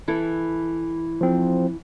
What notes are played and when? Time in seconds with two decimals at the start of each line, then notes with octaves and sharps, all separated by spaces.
0.08 E3 E4 A4
1.21 F3 C4